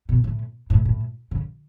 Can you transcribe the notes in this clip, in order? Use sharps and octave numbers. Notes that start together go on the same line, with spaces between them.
B2
A2
A2
A2
C#3